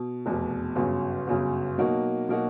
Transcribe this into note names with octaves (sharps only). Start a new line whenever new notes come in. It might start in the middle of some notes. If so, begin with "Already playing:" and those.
Already playing: B2
F1 E2 B2
G1 F#2 C#3
G1 F#2 C#3
B2 F#3 A#3 D#4 F#4
B2 F#3 A#3 D#4 F#4